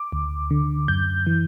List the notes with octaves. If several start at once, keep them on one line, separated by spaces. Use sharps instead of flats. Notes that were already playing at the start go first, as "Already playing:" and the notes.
Already playing: D6
D2
D3
F#2 G6
E3